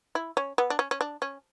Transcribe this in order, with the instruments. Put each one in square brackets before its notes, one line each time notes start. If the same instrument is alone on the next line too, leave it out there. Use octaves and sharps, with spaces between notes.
[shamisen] E4
C#4
B3
D4
C#4
C#4
D4
C#4